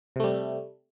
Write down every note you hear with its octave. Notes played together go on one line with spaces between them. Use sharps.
C3 G3 A3